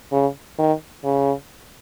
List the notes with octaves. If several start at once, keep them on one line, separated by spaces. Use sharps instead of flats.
C#3
D#3
C#3